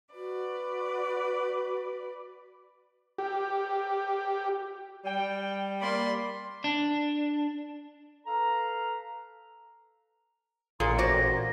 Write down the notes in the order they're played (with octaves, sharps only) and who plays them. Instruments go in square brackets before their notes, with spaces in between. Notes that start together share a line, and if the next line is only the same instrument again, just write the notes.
[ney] F#4 [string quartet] B4 D5
[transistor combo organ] G4
[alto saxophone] G3 [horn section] G5
[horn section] A#3 D5 [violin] B5 C6
[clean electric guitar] D4
[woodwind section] A4 B4 F5 A#5
[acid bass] A1 [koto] A#2 [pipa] G#4 [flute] C6
[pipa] C4 F#4 D5 [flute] A#6